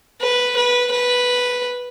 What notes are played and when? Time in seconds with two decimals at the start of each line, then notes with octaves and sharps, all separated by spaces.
0.21 B4
0.56 B4
0.91 B4